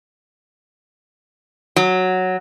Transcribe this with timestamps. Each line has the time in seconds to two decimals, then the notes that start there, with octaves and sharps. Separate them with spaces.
1.76 F#3